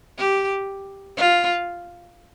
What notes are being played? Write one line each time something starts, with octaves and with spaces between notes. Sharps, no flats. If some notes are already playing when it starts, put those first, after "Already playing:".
G4
F4